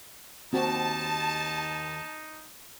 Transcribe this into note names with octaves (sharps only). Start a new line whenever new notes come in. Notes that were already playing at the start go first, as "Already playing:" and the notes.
D#2 C4 D#4 F#4 A5